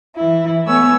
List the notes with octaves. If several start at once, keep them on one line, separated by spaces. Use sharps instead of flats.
E3 E4
A3 B3 C#5 G#5 E6